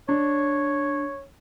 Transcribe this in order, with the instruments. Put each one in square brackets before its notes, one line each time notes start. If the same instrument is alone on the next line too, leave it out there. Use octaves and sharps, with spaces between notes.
[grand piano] D4 [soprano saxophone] C#5